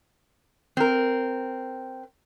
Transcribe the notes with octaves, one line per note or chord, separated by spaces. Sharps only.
C4 A#4